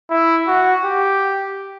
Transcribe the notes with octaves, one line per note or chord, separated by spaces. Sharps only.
E4
F#4
G4